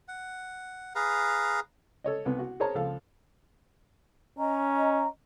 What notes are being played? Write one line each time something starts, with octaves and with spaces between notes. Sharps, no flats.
F#5
G#4 B4 F5 A#5
A4 C#5 D#5
C2 B3
F#4
G#4 A#4 C5 C#5 A5 A#5
C#2 F3 A4 F5
C#4 D#5 A#5